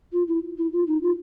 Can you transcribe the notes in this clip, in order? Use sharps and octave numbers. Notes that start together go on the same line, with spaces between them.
F4
E4
E4
F4
D#4
F4